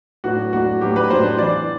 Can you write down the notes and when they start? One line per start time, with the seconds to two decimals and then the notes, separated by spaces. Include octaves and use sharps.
0.24 A2 F#3 B3 D4 F#4
0.53 A2 F#3 B3 D4 F#4
0.81 A2 F#3 B3 D4 G4
0.96 B4
1.10 A2 F#3 B3 D4 C5
1.39 E3 B3 D4 D5